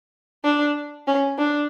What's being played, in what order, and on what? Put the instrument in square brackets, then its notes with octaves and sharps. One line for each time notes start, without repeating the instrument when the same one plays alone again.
[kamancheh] D4
C#4
D4